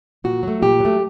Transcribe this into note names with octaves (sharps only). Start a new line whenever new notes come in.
A#2 F#4
F#3 A3
A#2 G4
F#3 A3